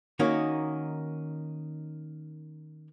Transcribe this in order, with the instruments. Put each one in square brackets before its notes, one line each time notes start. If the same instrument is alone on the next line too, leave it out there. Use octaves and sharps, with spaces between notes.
[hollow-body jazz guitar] D#3 A#3 C#4 D#4 F#4